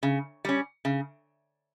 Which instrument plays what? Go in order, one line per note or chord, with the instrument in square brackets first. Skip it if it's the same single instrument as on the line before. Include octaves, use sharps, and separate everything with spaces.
[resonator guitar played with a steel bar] C#3
G3 C#4
C#3